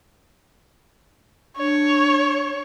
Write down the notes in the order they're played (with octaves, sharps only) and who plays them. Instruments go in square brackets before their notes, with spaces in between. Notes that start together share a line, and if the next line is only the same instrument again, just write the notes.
[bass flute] D4 [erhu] C#5